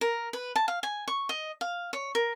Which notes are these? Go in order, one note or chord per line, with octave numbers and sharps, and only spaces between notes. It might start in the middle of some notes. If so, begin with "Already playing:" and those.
A#4
B4
A5
F5
G#5
C#6
D#5
F5
C#5
A#4